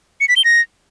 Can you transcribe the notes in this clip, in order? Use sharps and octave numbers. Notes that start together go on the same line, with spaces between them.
C#7
B6
G7
A#6